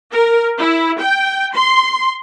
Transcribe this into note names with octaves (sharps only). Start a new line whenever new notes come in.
A#4
E4
G5
C6